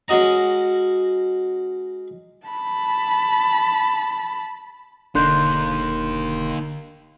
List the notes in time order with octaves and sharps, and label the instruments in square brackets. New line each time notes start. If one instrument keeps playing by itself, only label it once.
[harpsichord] G#3 C#4 F#4 D#5 A#5
[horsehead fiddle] A5 B5
[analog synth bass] E1 [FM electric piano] D3 [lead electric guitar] A#3 D#4 [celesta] C6 F#6 G6